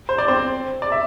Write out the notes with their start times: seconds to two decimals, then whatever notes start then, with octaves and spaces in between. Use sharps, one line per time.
0.09 C5
0.18 D5
0.28 C4 C5
0.82 D5
0.92 E5